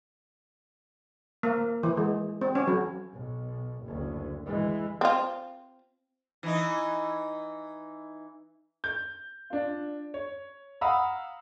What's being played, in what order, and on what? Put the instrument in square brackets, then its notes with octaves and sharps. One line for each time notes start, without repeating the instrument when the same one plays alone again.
[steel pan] A#3
E3
G#3
C4
C#4
F#3
[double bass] B1
F#1 D2
E3 G#3
[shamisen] C4 F4
[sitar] E3 D#4
[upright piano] G6
D4 F4
C#5
F5 F#5 A#5 B5 D#6 E6